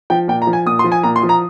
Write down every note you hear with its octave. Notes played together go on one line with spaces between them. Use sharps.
F3 G5
A#2 G5
A#5
F3
G#5
A#2 D#6
C6
F3
G#5
A#2 A#5
C6
F3
A#5